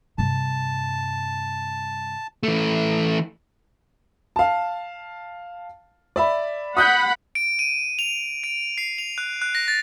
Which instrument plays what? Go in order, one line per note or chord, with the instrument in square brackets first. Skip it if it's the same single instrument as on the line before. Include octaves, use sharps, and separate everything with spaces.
[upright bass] G2 C3 [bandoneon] A5
[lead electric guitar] E3 A3
[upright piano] F5 A5
D5 E5 B5
[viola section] F#5 B5 [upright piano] D#6 F#6 G6
[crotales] D7
D#7
F7
D7
C7
F7
F#6
F#6
A#6
A6